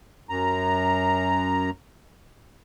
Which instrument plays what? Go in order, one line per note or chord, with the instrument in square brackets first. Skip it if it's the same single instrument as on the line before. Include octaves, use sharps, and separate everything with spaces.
[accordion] F#2 A#5